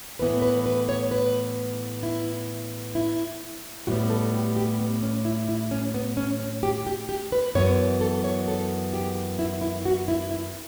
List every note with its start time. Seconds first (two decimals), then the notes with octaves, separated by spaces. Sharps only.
0.19 A2 E3 B3 B4
0.42 B4
0.66 B4
0.89 C#5
1.11 B4
2.03 E4
2.95 E4
3.87 A2 G3 B3 F#4
4.04 B4
4.10 A4
4.34 G4
4.56 G4
4.80 B3
5.02 C#4
5.25 E4
5.49 E4
5.71 C#4
5.94 B3
6.17 C#4
6.40 C#4
6.63 G4
6.87 G4
7.09 G4
7.32 B4
7.55 F#2 E3 B3 C#5
8.01 A4
8.24 C#5
8.48 A4
8.94 G4
9.39 E4
9.62 E4
9.85 F#4
10.08 E4
10.31 E4